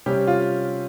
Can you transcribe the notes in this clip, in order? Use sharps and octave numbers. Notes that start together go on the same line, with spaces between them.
C3 G3 C#4 G4
F4